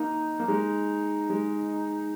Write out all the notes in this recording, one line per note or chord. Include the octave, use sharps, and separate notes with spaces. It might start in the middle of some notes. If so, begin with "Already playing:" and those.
Already playing: A#3 D#4
A#3
G#3 D#4
G#3